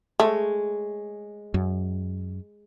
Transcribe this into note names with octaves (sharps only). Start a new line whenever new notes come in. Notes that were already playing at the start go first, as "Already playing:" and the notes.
G#3 A3 C#5
F#2